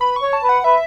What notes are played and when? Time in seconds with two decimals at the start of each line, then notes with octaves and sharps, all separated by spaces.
0.01 B4 B5
0.16 C#6
0.22 C#5
0.33 A5
0.43 B4
0.49 F#5
0.64 B4 E5